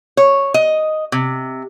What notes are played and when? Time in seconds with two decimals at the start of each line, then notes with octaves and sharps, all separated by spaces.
0.17 C#5
0.54 D#5
1.12 C3